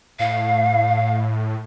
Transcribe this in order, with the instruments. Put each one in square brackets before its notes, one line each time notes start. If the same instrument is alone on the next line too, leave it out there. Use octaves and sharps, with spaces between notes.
[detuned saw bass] A2 [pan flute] F5